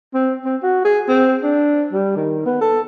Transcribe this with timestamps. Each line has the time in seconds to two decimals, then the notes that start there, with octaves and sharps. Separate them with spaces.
0.15 C4
0.45 C4
0.63 F#4
0.85 G#4
1.09 C4
1.43 D4
1.93 G3
2.17 D#3
2.46 B3
2.61 A4